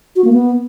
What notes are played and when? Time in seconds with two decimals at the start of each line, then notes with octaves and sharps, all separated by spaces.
0.16 F#4
0.24 A#3
0.33 B3